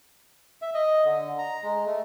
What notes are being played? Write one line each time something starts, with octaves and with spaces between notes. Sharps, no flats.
E5
D#5
D3
A#5
G#3
A3